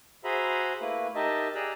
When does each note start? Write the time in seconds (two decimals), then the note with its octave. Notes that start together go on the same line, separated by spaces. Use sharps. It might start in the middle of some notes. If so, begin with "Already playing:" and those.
0.24 F#4 G#4 C5 E5 A#5 B5
0.81 A3 A#3 E4 B4
1.15 D#4 G4 A#4 D#5 E5 A5
1.55 G4 G#4 D5 A#5 E6 F#6